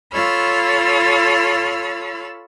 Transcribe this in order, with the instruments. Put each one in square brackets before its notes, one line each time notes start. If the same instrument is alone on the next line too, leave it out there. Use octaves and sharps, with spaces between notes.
[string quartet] F4 A4 C#5 B5 E6 F6